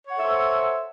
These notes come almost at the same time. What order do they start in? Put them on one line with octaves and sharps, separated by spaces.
C#5 F#5 A4 E5 C5